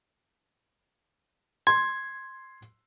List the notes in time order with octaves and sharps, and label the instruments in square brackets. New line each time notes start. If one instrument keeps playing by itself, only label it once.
[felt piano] C6 [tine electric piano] G#6